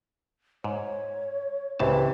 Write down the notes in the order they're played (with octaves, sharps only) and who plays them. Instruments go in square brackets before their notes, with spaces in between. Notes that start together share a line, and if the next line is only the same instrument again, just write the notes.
[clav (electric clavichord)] G#2 [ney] C#5
[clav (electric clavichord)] C#2 A2 A5 [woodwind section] C3 E3 [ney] C#4